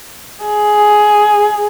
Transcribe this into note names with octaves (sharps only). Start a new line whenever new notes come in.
G#4